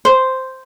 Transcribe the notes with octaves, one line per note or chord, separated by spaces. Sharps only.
C5